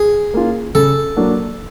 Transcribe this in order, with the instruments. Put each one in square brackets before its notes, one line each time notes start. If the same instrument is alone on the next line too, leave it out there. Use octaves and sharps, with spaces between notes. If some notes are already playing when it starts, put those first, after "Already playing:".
Already playing: [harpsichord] G#4
[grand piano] A#3 C#4 F4
[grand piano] C#3 [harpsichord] A4
[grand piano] F#3 A#3 D4 F#4